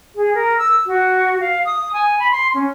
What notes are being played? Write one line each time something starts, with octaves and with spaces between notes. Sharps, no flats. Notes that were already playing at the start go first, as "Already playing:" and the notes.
G#4
A#4
E6
F#4
F5
D#6
G#5
B5
C6
C#4